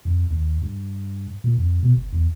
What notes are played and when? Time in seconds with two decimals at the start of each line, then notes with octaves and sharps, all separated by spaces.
0.05 F2
0.31 D#2
0.62 G2
1.44 A#2
1.58 F2
1.83 B2
1.97 G1
2.13 E2